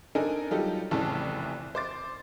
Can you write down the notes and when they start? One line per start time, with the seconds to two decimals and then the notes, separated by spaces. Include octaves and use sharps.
0.15 C4 D4 D#4 A4 A#4 G#5
0.51 F#3 G3 D#4 F4 G4 A4
0.91 F1 C2 A2 C#3 E3 A5
1.75 C5 D6 A6